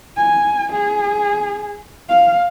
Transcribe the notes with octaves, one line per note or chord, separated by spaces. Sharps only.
G#5
G#4
F5